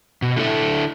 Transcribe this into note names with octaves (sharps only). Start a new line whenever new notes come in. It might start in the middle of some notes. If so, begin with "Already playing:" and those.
B2
D3 E4 A4 E5